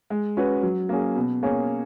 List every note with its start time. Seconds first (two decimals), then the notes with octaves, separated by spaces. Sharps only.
0.10 G#3
0.37 C#4 F#4 B4
0.63 F#3
0.89 A#3 C#4 G#4
1.16 B2
1.43 A#3 C#4 G#4 C#5